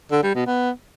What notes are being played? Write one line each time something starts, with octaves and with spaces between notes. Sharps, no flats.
D3
G3
B2
B3